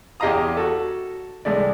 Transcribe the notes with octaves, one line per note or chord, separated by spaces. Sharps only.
E2 G4 D#5 F5 A#5 D#6
F#4 A4
C2 G#3 A3 D5